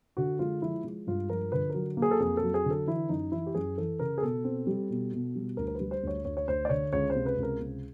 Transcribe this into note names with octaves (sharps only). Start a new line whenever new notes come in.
D3 F#4
G#3 F4
F3 E4
G#3
G2 F4
F3 A#4
D3 B4
F#3 A#4
A#3
G#4
A4
F2 G#4
A4
F#3
G#4
D3
A4
E3 E4
F#2 D#4
E3 E4
G4
F#2 G#4
E3 A4
C#3 A#4
G#4
B2 A4
C4
G3
B2
B2
G3
D2 A#4
A#4
B4
G3
C5
D2 C#5
D2 C#5
C#5
D2 C5
D5
D3 C#5
C#2 C#5
C5
C3
B4
C#2
A#4
C3